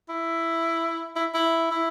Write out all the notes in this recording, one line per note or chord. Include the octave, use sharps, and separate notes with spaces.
E4
E4
E4
E4